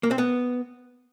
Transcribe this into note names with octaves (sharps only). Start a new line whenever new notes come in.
A#3
C4
B3